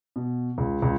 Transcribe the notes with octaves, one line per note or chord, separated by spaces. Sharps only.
B2
C#2
C#2